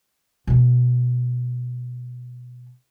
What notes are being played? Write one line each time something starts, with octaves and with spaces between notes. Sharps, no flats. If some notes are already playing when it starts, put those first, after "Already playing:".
B2 A3